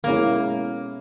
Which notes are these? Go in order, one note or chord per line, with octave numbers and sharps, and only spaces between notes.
B2 G#3 A#3 C#4 E4